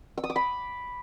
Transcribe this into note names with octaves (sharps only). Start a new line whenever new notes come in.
E6
D#6
D6
B5